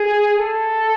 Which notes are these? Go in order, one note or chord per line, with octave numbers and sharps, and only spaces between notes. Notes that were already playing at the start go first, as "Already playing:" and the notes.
Already playing: G#4
A4